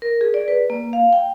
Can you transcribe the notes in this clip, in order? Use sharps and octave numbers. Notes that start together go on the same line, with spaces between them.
A#4
G#4
D5
B4
A#3
F5
G5